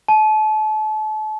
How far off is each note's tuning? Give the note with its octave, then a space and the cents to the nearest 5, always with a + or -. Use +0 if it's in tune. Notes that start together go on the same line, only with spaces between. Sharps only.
A5 -35